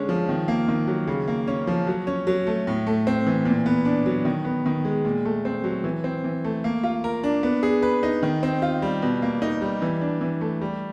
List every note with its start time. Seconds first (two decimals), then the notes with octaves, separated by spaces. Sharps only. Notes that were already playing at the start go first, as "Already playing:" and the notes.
Already playing: D3 G#3 C#4
0.09 F3
0.29 D#3
0.48 A#3
0.68 D#3
0.87 F#3
1.07 C#3
1.27 A#3
1.47 C#4
1.67 F3
1.87 F#3
2.07 C#4
2.27 F#3
2.47 A3
2.67 A2
2.87 A3
3.07 C4
3.27 E3
3.45 A#2
3.66 B3
3.85 D4
4.06 F#3
4.25 D#3
4.45 B3
4.66 D#3
4.85 G#3
5.05 A#2
5.25 A3
5.45 C4
5.64 F#3
5.84 E3
6.04 C4
6.24 E3
6.44 A3
6.64 A#3
6.84 F4
7.04 A#4
7.24 D4
7.43 B3
7.63 G#4
7.82 B4
8.03 D#4
8.23 D#3
8.43 C4
8.62 F4
8.82 G3
9.02 B2
9.22 A#3
9.42 D#4
9.62 G3
9.82 E3
10.01 D4
10.21 E3
10.41 A3
10.61 G3